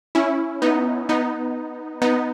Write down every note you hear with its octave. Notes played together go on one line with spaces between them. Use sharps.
C#4 E4
B3 D#4
B3 D#4
B3 D#4